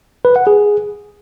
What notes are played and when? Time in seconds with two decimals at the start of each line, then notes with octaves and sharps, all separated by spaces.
0.25 B4
0.36 F#5
0.47 G#4